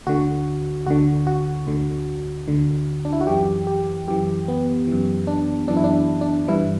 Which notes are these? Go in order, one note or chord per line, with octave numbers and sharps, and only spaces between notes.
D2 D3 F#4
D2 D3 F#4
F#4
D2 D3
D2 D3
D4
E4
F#4
F#2 E3 G4
G4
F#2 E3 G4
B3
F#2 E3
D4
F#2 E3 D4
E4
D4
D4
G2 E3 E4